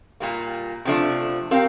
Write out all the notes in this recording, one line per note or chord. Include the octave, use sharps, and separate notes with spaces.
A#2 G3 A#3
C3 F3 A3 D4
C4 G4 A#4 F5